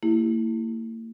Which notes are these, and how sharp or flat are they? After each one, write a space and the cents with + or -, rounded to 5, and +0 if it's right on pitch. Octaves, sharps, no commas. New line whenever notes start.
A#3 -45 E4 +0 G4 +0